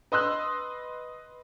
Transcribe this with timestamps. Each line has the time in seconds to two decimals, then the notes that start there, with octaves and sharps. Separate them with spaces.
0.12 B4 D#5 C6 E6 F#6